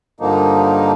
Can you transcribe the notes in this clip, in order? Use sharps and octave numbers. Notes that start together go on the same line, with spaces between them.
G2 D3 F3 A#3 D#4